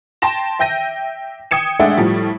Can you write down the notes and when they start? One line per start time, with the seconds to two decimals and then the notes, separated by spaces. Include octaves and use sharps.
0.22 G5 A5 C6 A#6 E7
0.59 E5 G5 G6 A#6 D#7
1.51 G5 D#6 G#6 C#7 E7
1.80 G#3 A3 D4 E5 F#5 G5
1.97 A2 F3 G3